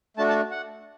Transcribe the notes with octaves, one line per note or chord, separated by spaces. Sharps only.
A3 D4 F#4 A5
A5
F#5